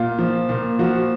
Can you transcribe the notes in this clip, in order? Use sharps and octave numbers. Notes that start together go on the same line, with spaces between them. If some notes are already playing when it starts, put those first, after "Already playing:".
Already playing: A#2 F4
F3
A#2
F3 F#4